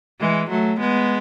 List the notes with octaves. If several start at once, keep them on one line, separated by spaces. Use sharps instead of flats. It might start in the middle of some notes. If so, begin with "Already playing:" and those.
E3 G#3
F#3 A3
G#3 B3